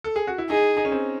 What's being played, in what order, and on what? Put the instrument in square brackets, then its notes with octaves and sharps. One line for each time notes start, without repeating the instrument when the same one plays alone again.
[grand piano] A4
G#4
F#4
E4
[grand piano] D#4 [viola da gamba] G#4
[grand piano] D#4
C#4
C4